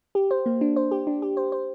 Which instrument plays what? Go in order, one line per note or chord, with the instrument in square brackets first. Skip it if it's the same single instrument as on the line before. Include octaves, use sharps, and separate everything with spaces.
[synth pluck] G4
C5
A#3
D4
C5
G4
D4
G4
C5
C5